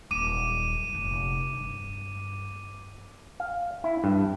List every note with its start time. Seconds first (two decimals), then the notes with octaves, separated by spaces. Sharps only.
0.11 D#1 F#2 D6 D#7
0.93 F1 A#2
1.53 G2
3.40 F5
3.84 E4
4.04 G2